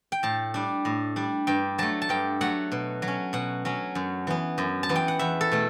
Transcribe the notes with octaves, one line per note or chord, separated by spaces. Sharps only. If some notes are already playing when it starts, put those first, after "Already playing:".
G5
A2 A5
G3 D4
A2
G3 D4
G2 G5
F#3 A3 A5
A5
G2 G5
F#3 A3 F#5
B2
F#3
C#4
B2 F#5
F#3 C#4
F#2
E3 B3
F#2
A5
E3 B3
G5
F#5
E2 E5
A4
B2 A3